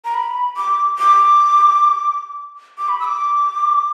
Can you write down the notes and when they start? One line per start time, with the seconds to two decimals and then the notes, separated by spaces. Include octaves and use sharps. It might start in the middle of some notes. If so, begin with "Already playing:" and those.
0.05 A#5
0.14 B5
0.56 D6
0.98 D6
2.78 D6
2.89 B5
3.00 E6
3.05 D6